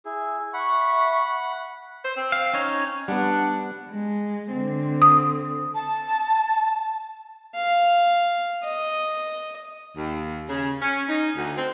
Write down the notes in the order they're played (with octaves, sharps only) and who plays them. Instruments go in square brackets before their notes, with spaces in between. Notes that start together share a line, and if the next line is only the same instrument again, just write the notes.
[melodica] E4 G#4
[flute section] E5 C#6 [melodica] F#5 B5
[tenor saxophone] C5
C4
[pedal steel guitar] F5
C#4 D#4 C#5
[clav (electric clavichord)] G3 B3 [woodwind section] D4 F#5
[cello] G#3
D3 C4
[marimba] D#6
[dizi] A5
[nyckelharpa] F5
D#5
[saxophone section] D#2
C#3
C#4
D#4
D2
C4